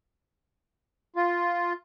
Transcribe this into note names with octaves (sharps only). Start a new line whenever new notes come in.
F4